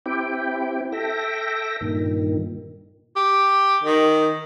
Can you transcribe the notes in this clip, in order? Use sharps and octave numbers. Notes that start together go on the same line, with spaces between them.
C4 E4 G4 G5
A4 E5 G5 A#6
G2 A#2 D#3
G4
D#3